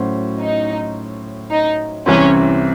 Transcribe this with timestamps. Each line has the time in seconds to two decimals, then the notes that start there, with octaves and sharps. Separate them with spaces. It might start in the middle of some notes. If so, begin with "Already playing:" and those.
Already playing: A2 F#3 C#4 F#4 C5
0.39 D#4
1.50 D#4
2.06 C2 C3 E3 C4 C#4